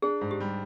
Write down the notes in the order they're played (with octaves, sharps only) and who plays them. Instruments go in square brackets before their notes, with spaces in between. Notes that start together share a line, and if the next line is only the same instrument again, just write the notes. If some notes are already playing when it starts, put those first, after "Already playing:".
[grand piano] D4 [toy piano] G#4
[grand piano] G#2
[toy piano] G4
[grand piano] G3